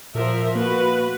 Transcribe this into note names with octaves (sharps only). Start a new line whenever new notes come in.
A#2 F3 A#4 E5
A#3 F#4 B4